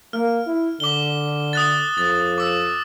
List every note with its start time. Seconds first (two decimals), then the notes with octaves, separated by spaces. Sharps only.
0.13 A#3 F6
0.47 E4
0.80 D3 D6 G7
1.53 D#6 F#6 A6
1.98 F2 A6
2.38 D6 E6